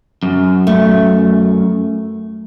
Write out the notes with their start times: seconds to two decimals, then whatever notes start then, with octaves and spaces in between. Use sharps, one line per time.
0.23 F#2
0.67 A3